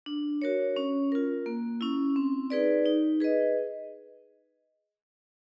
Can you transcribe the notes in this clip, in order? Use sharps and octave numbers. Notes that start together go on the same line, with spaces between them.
D4
F#4 A#4 C#5
C#4
F4 A#4
A#3
C#4 E4
C4
D#4 G#4 B4 D5
D#4
G#4 B4 D#5